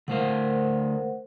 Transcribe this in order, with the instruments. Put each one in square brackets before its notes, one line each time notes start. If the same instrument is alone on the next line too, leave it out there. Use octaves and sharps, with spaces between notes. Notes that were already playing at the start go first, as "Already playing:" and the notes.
[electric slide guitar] D3 A3 F5 [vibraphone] A#4 C5 F#5